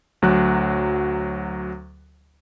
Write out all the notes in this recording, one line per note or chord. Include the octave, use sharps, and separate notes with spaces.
D2 F#3 F#6